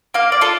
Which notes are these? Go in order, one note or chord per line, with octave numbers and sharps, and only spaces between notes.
A#3 F5
D5
F4 A4